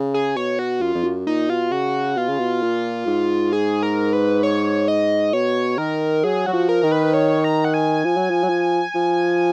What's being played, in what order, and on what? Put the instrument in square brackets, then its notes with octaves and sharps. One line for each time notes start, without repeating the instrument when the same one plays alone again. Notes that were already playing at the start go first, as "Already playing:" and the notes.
Already playing: [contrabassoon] C#3
[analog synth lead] G#4
[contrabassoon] B2 [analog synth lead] C#5
[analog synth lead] F#4
[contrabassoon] F#2 [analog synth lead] F4
[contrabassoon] F2
F#2
[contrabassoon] A#2 [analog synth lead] D#4
[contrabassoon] B2 [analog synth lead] F4
[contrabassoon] C#3 [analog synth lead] F#4
[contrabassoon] B2 [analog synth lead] F4
[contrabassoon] C#3
B2
A#2
G#2
[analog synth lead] G#4
A#4
B4
C#5
D#5
[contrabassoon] B2 [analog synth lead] C#5
[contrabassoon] D#3 [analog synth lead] A#4
[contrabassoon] F#3 [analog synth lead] G#4
[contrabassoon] F#3 [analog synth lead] F#4
[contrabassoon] F3
[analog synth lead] A#4
[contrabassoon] D#3
[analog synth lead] B4
C#5
A#5
F#5
G#5
[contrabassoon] F3
F#3
F3
F#3
F3
F3